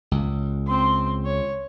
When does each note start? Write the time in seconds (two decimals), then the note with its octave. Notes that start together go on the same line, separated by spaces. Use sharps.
0.11 C#2
0.66 C4 C6
1.25 C#5